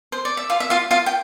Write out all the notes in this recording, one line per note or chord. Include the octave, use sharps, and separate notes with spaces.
C5
D5
E5
F4 F5
E5
F4 F5
F4 F5
G5